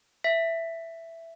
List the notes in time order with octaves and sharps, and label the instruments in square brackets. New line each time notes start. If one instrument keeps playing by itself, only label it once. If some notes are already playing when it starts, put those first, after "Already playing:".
[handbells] E5 B6